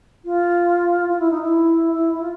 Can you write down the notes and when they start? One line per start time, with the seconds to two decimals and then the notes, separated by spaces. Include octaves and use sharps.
0.25 F4
1.08 F4
1.19 E4
1.30 D#4
1.41 E4
1.92 E4
2.13 E4
2.21 F4